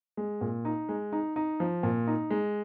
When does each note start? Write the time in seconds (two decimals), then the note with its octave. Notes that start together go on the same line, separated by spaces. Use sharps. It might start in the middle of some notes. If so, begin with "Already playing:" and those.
0.17 G#3
0.41 A#2
0.65 D#4
0.89 G#3
1.12 D#4
1.36 D#4
1.60 F3
1.83 A#2
2.07 D#4
2.31 G#3